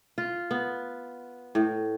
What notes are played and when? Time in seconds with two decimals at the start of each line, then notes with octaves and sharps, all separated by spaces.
0.18 F4
0.51 B3
1.55 A2